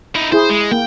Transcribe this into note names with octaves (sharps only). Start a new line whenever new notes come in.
D#4 E4
E4 G#4 C5
G#3
A#3 G5